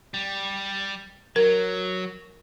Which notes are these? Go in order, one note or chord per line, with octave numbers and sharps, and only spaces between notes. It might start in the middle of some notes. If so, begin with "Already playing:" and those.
G3
F#3 A#4